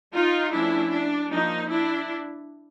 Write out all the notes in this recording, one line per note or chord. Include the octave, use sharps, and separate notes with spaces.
D#4 F4
F3 A3 C#4 D4 E4
D4
F3 A#3 D4 D#4
D4 E4